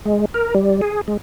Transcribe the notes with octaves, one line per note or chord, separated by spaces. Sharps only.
G#3
A#4
G3
G#4
G#3